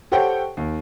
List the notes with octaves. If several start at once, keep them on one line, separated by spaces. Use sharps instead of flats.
G4 A4 C5 C#5 F#5 G5
D#2